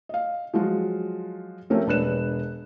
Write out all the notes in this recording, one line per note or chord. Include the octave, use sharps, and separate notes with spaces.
D#5 F5
F3 F#3 G#3 F4 F#4
F3 A3 C4 C#4 G4 A#4
E1 D4 B4 F#6 E7